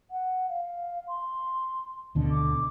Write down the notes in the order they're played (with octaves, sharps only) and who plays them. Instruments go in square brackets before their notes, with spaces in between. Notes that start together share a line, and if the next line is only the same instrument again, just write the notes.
[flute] F#5
F5
C6
[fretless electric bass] D2 B2 D3
[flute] D6